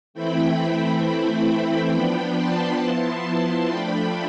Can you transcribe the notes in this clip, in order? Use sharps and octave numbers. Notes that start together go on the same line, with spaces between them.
E3 A3 C4 E4 G5 B5
G5 B5
E3 A3 C4 E4 G5 B5
F3 B3 D4 G5 B5
A5 C6
F3 B3 E4
F3 A3 D4 G5 B5